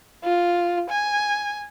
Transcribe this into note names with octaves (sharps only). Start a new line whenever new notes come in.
F4
G#5